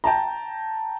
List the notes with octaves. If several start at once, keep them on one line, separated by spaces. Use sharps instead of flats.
G5 A5 A#5